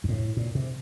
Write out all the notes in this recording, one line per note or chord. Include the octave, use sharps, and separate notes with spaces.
G2
A2
A#2
C3